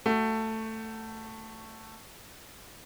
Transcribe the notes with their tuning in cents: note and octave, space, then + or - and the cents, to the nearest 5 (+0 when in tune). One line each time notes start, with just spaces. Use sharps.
A3 +10 F#4 +0